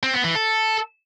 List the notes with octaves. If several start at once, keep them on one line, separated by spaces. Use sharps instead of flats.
C4
B3
E3
A4